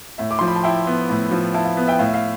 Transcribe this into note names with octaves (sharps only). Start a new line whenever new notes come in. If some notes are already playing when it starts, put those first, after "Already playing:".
A2 E5
D6
F3 C6
B5
A5
E4 E5 G5
B3
A2
F3
E4 F5 A5
F5
B3
E5 G5
A2 F5
E5
F5